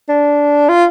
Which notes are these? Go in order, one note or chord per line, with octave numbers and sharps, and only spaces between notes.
D4
F4